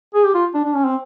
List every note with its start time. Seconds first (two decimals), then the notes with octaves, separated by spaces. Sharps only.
0.14 G#4
0.24 G4
0.34 F4
0.54 D4
0.65 D4
0.74 C#4
0.85 C4